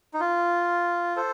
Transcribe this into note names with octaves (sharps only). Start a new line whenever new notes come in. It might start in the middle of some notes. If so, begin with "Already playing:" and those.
D#4
F4
A4 C5